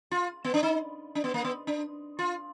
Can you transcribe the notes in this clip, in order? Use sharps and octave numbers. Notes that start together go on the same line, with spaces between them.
F4
B3
D4
D#4
D4
B3
A#3
B3
D4
F4